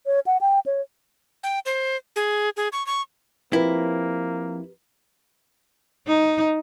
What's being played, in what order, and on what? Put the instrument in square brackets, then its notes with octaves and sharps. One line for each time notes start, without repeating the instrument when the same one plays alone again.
[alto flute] C#5
F#5
G5
C#5
[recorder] G5
C5
G#4
G#4
C#6
C#6
[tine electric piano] F3 C4 [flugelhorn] A#3 [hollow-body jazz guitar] E4 [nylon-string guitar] G4 A#4 B4
[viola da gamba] D#4